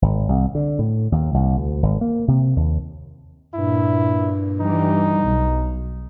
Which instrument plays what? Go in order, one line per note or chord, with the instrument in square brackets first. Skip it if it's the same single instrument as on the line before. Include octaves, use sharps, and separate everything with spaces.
[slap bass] G#1
C2
D3
A2
D#2
C2
D2
G#1
A#3
C3
D#2
[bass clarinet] G2 [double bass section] A#2 [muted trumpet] E4
[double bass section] E3 G3 [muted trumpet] D#4
[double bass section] B1